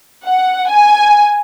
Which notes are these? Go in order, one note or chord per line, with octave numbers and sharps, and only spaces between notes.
F#5
G#5